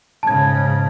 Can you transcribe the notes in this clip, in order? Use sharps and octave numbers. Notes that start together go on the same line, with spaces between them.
G#2 C#3 A5 G#6